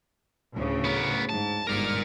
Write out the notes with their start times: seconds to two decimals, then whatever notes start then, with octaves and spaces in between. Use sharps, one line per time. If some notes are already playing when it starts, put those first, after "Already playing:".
0.53 D2 A2 C#3
0.84 B3 A#4
1.30 G#2 A5
1.67 G1 G#2 A#4 D5 F6